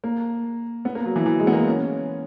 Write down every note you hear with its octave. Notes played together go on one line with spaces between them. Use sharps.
A#3
B3
A#3
F#3
E3
E3
G#3
B3
A#3
C#4